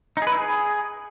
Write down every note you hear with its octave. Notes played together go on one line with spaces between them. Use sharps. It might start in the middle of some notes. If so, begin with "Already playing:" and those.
D#4
G#4
B4
E4
G#4